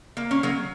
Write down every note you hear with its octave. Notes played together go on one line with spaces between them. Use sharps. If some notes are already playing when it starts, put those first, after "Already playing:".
A#3
C#4
F#3 A#3